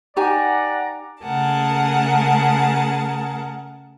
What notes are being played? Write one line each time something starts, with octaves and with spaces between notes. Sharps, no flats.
D#4 G4 D5 F#5 G#5 A#5
C#3 A3 G#4 A#4 F#5 A5